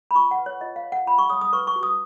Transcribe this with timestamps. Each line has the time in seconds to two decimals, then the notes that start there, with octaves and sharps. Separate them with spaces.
0.11 B5
0.15 F4 C#6
0.31 F#5
0.38 B4
0.46 C#5
0.61 F4 D#5
0.76 F5
0.83 C#5
0.92 F#5
1.06 F4 B5
1.18 C#6
1.30 C#5 D#6
1.41 D#6
1.53 B4 C#6
1.67 C#6
1.76 F#4
1.83 D#6